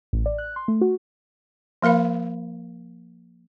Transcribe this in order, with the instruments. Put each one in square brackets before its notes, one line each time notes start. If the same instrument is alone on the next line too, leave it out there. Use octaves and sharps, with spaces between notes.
[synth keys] A1
D5
F#6
C6
A3
F#4
[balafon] F3 A#3 A#4 F5 B5